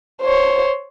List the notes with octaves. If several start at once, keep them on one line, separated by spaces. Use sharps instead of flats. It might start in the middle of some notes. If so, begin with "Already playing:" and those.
C5 C#5